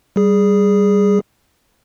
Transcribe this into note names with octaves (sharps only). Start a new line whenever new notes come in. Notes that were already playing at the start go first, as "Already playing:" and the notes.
G3 G#4